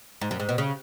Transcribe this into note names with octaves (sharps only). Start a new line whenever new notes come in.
G#2
F#2
G#2
B2
C#3